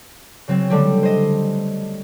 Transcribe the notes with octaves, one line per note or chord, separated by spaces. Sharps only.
C#3 F#3 C4
D3 G3 A3 C4 G4
C5 D#5